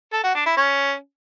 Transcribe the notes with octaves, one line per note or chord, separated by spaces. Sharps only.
A4
F#4
D4
E4
C#4